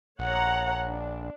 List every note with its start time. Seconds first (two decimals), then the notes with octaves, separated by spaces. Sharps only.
0.19 A#1 C#5 F#5 A#5
0.89 D4